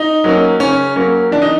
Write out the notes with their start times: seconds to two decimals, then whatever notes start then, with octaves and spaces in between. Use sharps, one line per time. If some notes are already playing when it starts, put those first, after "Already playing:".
Already playing: D#4
0.24 F#3 A#3 C#4
0.60 C#3 C#4
0.96 F#3 A#3 C#4
1.31 E3 D4
1.42 D#4